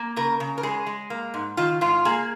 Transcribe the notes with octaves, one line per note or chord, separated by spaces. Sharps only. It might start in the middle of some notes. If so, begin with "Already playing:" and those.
Already playing: A#3
C#3 A#4
C#3
A#4
G#3 G#4
G#3
A#3
G#2
D#3 F4
G#2 F4
A#3 G#4